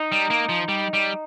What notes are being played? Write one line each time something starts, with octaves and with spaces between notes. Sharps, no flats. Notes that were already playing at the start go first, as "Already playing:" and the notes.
Already playing: D#4
G3
A#3
F3
G3
G3